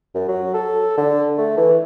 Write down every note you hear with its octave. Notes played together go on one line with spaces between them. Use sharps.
F#2
F#3
A4
D3
A3
E3